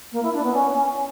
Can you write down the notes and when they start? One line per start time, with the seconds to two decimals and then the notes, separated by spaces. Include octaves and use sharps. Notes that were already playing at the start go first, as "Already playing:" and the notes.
0.11 A#3
0.22 E4
0.33 D4
0.43 B3
0.54 C#4